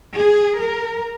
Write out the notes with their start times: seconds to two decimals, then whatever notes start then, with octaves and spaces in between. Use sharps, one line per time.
0.15 G#4
0.59 A#4